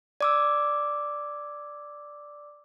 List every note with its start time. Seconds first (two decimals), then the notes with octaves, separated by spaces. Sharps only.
0.21 D5 D6 E6